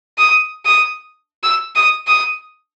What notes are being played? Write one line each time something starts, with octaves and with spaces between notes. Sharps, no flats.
D#6
D#6
E6
D#6
D#6